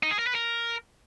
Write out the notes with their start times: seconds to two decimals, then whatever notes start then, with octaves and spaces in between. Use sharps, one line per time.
0.03 D#4
0.11 G#4
0.19 A#4
0.27 B4
0.35 A#4